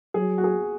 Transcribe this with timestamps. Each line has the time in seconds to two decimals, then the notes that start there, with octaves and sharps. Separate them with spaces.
0.14 F#3 G#4
0.38 F#4
0.44 G#4